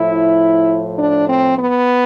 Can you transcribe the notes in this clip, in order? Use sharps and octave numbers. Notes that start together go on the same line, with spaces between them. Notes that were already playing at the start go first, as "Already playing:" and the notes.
Already playing: A2 F3 E4
D4
C4
B3